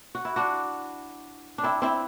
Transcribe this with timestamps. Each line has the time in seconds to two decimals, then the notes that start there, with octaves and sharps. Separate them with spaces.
0.15 F#4
0.25 E4
0.36 D4 F#4
1.58 D4
1.63 C4 E4
1.82 C4 E4